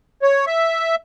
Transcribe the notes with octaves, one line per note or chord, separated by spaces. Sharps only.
C#5
E5